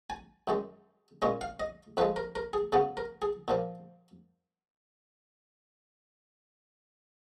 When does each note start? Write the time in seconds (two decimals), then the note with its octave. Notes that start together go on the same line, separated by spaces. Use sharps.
0.10 G#5
0.48 F#2 D#3 G#3
1.22 A#2 G#3 C#4 D#5
1.41 F5
1.60 D#5
1.97 F2 F3 G#3 B4
2.16 A#4
2.35 A#4
2.53 G#4
2.72 C#3 F#3 B3 G#4
2.97 A#4
3.22 G#4
3.48 A#2 F3 A#3